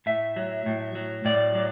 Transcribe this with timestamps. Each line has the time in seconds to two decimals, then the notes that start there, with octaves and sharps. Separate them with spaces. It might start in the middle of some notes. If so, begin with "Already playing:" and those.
0.06 A2 E5
0.36 F#3
0.66 A2
0.95 F#3
1.25 A2 D5
1.55 F#3